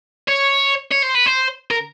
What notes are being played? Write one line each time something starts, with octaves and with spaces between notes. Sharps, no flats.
C#5
C#5
C5
B4
C5
A#4